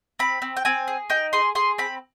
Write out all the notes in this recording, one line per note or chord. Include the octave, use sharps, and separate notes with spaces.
C4 B5
C4
G5
C4 G#5
G#4
D#4 G5
G#4 C6
G#4 C6
C4 B5